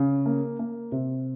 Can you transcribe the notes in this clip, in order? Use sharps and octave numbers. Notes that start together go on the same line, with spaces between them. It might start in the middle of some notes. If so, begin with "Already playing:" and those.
Already playing: C#3
A#3
A#3
C3